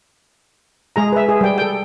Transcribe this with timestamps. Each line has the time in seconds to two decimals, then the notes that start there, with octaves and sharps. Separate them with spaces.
0.96 G#3 G#4 A#5
1.13 B4 E5
1.29 G#4
1.41 G3 G5
1.58 A4 G5